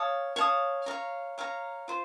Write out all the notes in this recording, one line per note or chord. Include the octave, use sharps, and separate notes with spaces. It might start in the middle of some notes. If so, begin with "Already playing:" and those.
Already playing: C#5 F5 A5 D#6
C#5 F5 A5 D#6
C#5 F5 A#5
C#5 F5 A#5
F4 C5